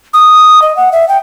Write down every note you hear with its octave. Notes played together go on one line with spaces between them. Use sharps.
D#6
D#5
F#5
E5
G5